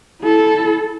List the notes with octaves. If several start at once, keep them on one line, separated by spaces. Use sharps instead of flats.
E4 A4